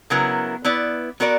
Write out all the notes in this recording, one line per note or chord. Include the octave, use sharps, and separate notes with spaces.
C#3 F#3 B3 E4 A#4
B3 E4 B4 D5
B3 F#4 A#4 D5